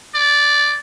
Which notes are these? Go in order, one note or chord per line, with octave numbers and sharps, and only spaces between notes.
D5